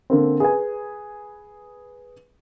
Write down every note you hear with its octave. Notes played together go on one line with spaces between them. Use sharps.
D3 A#3 C4
G#4 B4 G#5